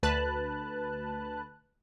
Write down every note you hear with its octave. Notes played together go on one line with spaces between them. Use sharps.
D2 B4 A5 F#6